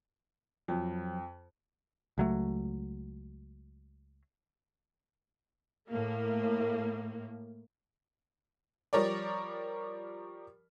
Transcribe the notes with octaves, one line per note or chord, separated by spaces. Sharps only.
F2 F3 F#3
C#2 F#3 A3
A2 A#3
F3 G3 A#4 C#5 D5